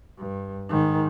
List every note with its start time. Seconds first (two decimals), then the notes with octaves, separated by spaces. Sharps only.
0.19 G2
0.69 G#2 D#3